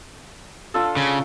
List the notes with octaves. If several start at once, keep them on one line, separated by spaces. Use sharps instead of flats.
D4 F4 A4
C#3